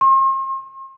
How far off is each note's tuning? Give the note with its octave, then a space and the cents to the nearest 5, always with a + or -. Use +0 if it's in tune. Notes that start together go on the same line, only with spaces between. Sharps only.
C6 +40